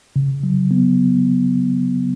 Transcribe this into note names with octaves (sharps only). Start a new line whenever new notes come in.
C#3
F#3
B3